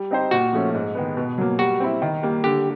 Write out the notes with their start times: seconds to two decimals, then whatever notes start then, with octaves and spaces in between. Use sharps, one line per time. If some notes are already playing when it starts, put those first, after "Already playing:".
Already playing: G3
0.11 C4 D#4 G4 C5
0.31 A#2 F#4
0.53 F3 A3 C#4
0.74 G#2
0.95 D#3 G#3 B3
1.17 B2
1.38 F#3 A#3
1.59 G3 F#4
1.80 C4 E4
2.02 D#3
2.22 G3 A#3
2.44 D3 G4